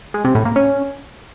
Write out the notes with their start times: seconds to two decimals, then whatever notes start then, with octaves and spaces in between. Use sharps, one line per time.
0.14 G#3
0.25 C3
0.35 A2
0.45 A#3
0.56 C#4